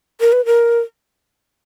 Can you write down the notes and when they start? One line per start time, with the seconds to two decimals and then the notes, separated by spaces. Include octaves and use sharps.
0.21 A#4
0.33 B4
0.46 A#4